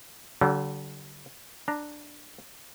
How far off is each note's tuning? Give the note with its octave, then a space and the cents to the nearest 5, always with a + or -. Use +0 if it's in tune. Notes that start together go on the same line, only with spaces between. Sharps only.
D3 -20 F#3 +45
D4 +10 A#5 +0